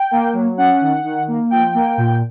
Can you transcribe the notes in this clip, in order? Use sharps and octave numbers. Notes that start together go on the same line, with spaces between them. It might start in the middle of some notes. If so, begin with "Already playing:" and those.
Already playing: G5
A#3
F#3
C#4 F#5
D#3
D#3
A#3
F3 G5
A#3
A#2